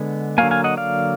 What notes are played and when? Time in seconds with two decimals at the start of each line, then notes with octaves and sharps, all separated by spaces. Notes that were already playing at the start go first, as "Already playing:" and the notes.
Already playing: D3 G#3 B3
0.38 D3 F#3 A#3 F5 G#5
0.51 F5 G#5
0.64 D#5 F#5
0.77 D5 F5